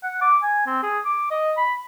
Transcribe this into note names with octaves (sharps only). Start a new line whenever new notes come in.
F#5
D6
G#5
C4
G#4
D6
D#5
B5